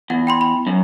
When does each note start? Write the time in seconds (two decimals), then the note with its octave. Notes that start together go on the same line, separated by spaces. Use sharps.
0.10 E2 F#5
0.27 G5 B5 C6
0.41 B5
0.67 F#2